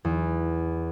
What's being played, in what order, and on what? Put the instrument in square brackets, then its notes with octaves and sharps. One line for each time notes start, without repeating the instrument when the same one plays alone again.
[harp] E2